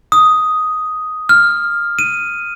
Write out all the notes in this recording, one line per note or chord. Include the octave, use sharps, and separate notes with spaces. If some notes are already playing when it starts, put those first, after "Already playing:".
D#6
F6
D#7